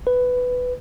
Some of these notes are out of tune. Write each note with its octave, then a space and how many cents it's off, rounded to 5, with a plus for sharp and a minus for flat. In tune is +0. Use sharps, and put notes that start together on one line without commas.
B4 +10